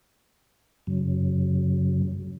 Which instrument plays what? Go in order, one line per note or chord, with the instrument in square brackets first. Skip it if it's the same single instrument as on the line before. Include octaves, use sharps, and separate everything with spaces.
[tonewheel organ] F#2 C#3 F#3